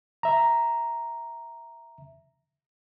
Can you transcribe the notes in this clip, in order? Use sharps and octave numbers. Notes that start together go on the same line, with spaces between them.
E5 A#5